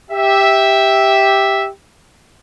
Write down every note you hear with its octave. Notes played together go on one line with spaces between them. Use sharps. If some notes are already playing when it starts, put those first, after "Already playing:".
G4 E5